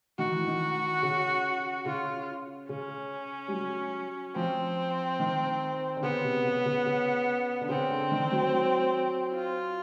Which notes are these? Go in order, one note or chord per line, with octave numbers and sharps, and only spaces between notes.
D#3 F#4
E3
D#3
C#3
C#3 F4
C#3 C#4
G3
F#3
F3 C4
D#3
D3
C#3 B3
C3
C#3
C#3
C#3
D3
C#3 C4
D3
D#3
F#3
F#3
F4